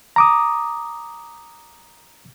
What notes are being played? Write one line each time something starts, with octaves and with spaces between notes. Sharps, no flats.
A#5 D6 D#6